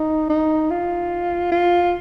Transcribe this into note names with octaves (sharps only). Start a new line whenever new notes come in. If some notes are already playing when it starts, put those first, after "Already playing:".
Already playing: D#4
D#4
F4
F4